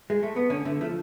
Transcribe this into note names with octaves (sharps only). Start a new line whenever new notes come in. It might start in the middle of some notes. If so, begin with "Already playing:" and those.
G#3
A3
B3
D3 C#4
D3 A3
F3 A3